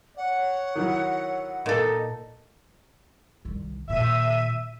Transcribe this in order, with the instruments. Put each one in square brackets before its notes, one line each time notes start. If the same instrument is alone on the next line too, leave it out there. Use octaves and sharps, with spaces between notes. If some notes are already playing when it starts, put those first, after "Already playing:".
[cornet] C#5 [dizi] F#5
[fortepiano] D#3 F#3 E4
[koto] A#2 A4 [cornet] D#4
[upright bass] C2 D#3
[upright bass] A#2 D#3 [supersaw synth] E5 D#7